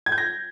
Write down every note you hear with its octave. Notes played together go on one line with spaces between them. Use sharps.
G#6
G6
A#6